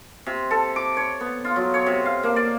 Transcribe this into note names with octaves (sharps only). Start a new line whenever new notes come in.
C3
A4
D6
C#5
B3
F4
F#3
C#5
C3
F5
A#3
D5